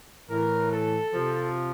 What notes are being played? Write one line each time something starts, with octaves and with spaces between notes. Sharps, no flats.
A2 E3 A#4
A4
C3 F3